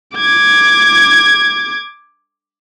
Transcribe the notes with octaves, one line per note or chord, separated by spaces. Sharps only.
D6 G#6